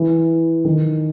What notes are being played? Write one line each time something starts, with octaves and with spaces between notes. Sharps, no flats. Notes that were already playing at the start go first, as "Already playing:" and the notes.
Already playing: E3
D#3